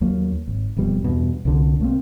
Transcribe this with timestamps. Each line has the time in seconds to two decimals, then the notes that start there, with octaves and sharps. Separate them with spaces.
0.01 D#2 F#3 A#3
0.47 G#1
0.76 D#1 F2 B2 G3
1.04 E2 G2 B2
1.45 C2 D3
1.80 B1 A3 A#3 C4